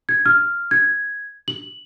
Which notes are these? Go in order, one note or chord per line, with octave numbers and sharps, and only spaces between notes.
G#6
F6
G#6
F#7